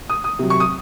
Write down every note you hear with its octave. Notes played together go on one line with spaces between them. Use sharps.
D#6
D#6
C3 F#3
C#6
D#6